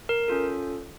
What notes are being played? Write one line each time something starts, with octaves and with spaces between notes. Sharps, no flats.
A#4
C#4 F4 A4